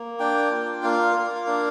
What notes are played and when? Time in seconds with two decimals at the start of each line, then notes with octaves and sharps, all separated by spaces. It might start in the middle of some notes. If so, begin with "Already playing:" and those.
Already playing: A#3
0.19 D4 G5
0.51 F4
0.83 A#3 F5
1.15 A#3
1.47 D4